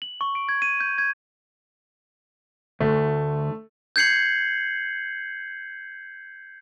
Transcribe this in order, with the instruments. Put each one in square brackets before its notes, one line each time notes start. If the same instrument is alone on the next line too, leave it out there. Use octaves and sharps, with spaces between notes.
[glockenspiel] F#7
C#6
D7
G#6
D#7
G6
G#6
[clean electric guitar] D2 [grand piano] A3
[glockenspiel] G6 G#6 C7 C#7 F#7